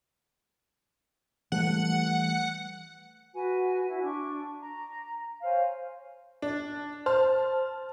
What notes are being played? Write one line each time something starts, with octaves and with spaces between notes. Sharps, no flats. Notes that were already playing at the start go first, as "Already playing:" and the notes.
E3 G3 A3 F#5
F#4 B4 G#5
E4 F#4
D4 C#6
A#5
C5 C#5 F5 G#5
D4
C5 A5 F6